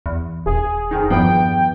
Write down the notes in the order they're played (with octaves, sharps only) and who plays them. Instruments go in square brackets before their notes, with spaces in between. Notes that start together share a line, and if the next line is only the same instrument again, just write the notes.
[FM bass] E2
[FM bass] D#1 [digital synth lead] G#4
[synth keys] F2 D#3 D#4
[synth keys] E2 G2 B3 [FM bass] F3 [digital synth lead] G5